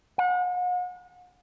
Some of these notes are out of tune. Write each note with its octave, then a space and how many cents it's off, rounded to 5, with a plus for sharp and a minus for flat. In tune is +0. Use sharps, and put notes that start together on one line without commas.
F#5 -40